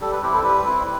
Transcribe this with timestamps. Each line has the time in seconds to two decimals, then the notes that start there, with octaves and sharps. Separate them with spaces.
0.01 G3 A4
0.12 B4
0.23 C4 E4 G4
0.34 A4
0.44 G3 B4
0.66 C4 E4